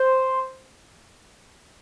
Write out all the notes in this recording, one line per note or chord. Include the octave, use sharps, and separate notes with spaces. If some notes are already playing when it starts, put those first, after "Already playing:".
Already playing: C5